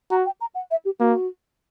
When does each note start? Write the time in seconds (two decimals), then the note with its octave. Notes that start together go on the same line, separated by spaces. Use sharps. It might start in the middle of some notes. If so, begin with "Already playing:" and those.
0.11 F#4 A#5
0.26 G5
0.41 A#5
0.55 F#5
0.71 E5
0.85 G4
1.00 A#3 F#4